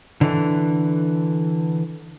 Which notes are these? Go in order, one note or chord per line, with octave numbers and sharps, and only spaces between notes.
D3 E3